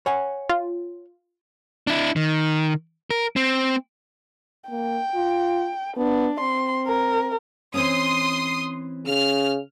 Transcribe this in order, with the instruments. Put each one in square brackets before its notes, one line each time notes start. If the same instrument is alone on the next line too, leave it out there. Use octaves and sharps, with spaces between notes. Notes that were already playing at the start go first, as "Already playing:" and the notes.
[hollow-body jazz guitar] C#5 F#5 G#5
[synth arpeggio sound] F4
[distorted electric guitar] D4 E4
D#3
A#4
C4
[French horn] A#3 [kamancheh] G5
[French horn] F4
[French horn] B3 [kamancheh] D4
[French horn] C4 [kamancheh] C6
[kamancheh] A#4
[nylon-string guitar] E3 C4 C#4 [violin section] C6 D#6
[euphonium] C#3 [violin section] F6